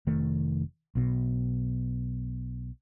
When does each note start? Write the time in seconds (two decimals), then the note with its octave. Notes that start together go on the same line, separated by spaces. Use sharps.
0.07 F1 D#3 A3
0.95 B1 B2